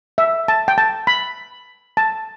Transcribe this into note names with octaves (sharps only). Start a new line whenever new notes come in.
E5
A5
G5
A5
B5
A5